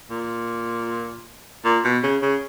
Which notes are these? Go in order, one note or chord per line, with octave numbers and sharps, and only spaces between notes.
A#2
A#2
B2
C#3
C#3